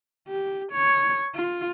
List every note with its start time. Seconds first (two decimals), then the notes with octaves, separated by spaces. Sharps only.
0.28 G4
0.72 C#5
1.34 F4